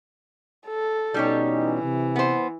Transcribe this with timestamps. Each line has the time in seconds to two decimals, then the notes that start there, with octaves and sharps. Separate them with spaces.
0.67 A4
1.14 B2 G3 C#4 D#4 G4 C#5
1.51 E3
1.83 C3
2.16 B3 C5